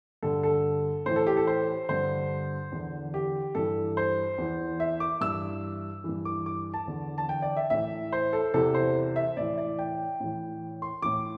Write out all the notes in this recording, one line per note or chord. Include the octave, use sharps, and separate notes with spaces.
G2 D3 A4
A4
A2 E3 C5
A4
G4
A4
C5
G2 D3 C5
E2 D3
G4
G2 E3 A4
C5
E2 E3
E5
D6
G2 E3 E6
G2 E3
D6
D6
A5
E2 D3
A5
G5
D5
E5
A2 E3 E5
C5
A4
E2 C3 E3 A4
C5
E5
A2 E3 D5
D5
G5
A2 E3
C6
A2 E3 D6